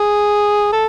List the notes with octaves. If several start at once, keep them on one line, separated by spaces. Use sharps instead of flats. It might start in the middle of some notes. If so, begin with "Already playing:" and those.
Already playing: G#4
A4